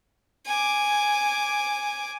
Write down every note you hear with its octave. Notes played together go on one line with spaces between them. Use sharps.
G#5 D6